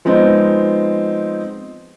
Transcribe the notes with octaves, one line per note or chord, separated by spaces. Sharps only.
F3 G#3 B3 C4 D#4